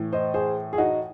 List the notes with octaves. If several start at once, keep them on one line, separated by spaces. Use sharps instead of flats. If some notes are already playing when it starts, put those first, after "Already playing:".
Already playing: A2 E3
C5 D#5
G#4 C5
G#4
D#4 F#4